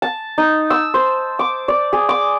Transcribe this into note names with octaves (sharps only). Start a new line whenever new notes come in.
A5
D#4
E6
C5
D6
D5
G#4
D6